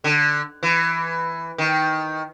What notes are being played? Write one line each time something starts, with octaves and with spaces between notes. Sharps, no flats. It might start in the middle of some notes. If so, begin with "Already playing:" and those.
D3
E3
D#3